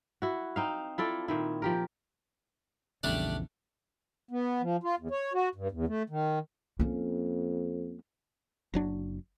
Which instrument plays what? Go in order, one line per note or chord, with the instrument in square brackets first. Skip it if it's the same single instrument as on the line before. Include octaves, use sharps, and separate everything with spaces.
[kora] E4 F#4
C4 D#4 F5
E4 F4 A4 D5
A#2 D#3 E4
F3 G4 A#4
[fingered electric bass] A#1 E2 C#3 [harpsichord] G3 A3 D4
[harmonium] B3
F3
F4
E2
C#5
F#4
G2
E2
A3
D#3
[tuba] F2 [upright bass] A#3 C#4
[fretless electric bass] F#1 F#3 D4